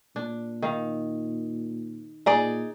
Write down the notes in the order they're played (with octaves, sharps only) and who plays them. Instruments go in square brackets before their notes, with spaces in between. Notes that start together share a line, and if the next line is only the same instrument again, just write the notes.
[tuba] A#2 [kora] D4
[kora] D#3 F5
[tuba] A#2 [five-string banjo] D#4 G#4 D5